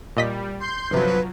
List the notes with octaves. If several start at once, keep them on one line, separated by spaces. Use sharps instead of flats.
A#2 G3 D#5 B6
C6 G6
G1 C3 F3 F#3 B4